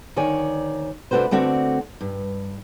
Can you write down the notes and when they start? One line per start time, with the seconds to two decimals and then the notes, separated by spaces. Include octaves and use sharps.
0.16 D2 D#3 C#5 D5 G#5
1.11 C3 A3 D4 F#4 B4 C5
1.31 D3 A3 C4 F#4 D5
2.01 G2